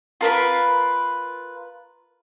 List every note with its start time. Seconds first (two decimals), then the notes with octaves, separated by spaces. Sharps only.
0.21 F4 A#4 B4 B5